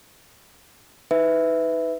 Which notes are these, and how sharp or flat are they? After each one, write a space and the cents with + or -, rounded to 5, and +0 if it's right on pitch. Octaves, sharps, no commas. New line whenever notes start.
D#4 +30 B4 +15 E5 -5